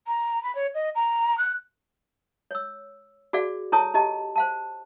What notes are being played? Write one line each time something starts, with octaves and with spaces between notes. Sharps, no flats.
A#5
B5
C#5
D#5
A#5
F#6
C#5 E6
F#4 G#4 D5 F5
E4 A4 C#5 A5 D#6
E4 G4 D#5 A5
C5 F5 A5